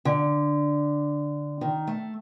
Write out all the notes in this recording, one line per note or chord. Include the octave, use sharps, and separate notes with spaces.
D3
D#3
A3